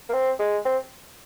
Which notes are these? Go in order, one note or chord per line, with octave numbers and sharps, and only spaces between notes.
A#3
C4
G#3
C4